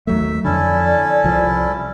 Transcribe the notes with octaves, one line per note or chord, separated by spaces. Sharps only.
D#2 F#3 A3 E5
F2 D3 C#4 E4 A4 D5
C2 F3